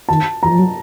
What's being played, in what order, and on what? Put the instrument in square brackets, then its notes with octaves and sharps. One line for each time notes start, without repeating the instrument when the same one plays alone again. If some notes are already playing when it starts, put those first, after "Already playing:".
[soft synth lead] D#3 [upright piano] A5
[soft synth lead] E3 [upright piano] A#5
[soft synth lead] F3
F#3